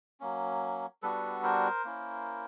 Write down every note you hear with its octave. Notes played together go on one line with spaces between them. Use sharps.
F#3 A#3 C#4
G3 B3 D4 F#4 A4 B4
A#4 C5
A#3 C#4 E4